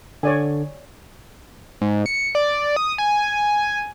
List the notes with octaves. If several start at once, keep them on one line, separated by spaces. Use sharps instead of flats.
D3 C#5 D5 G#5
G#2
C#7
D5
D#6
G#5